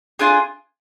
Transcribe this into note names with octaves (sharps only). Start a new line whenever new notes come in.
D4 F4 G#4